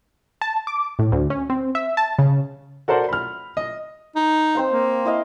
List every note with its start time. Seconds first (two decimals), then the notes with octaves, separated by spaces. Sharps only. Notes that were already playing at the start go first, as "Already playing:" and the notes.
0.41 A5
0.67 D6
0.99 A2
1.12 D2
1.30 C#4
1.50 C4
1.75 E5
1.97 A5
2.19 C#3
2.88 F#4 A4 A#4 C5 D5 F#5
3.09 B5 F6
3.57 D#5
4.15 D#4
4.55 C4 C5 F5
4.71 A#3
5.05 E4 D#5 F5